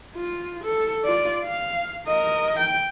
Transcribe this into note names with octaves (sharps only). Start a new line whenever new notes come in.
F4
A4
F4 D5
F5
A#4 D#5
G5